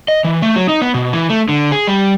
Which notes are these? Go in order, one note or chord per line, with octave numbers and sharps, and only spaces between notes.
D#5
E3
A3
F#3
D#4
B3
B2
E3
A3
D3
G#4
G3